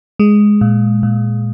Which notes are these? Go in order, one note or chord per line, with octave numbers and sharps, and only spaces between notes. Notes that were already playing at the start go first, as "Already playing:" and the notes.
G#3
A#2
A#2